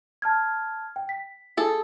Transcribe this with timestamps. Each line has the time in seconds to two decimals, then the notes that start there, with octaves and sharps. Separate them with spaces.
0.22 A5 F6 G#6
0.96 G5
1.09 B6
1.57 G#4 A4